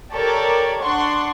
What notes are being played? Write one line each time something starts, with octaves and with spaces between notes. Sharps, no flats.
G4 A4 A#4 C#5 D5
D4 F#5 C6 C#6